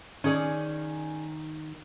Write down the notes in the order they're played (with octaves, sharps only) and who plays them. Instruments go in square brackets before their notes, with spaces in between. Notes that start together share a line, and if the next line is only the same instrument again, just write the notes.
[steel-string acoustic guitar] D#3 [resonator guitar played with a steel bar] C#4 G#4 D5